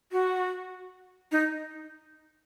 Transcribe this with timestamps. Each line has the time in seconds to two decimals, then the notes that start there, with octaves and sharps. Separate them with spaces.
0.12 F#4
1.32 D#4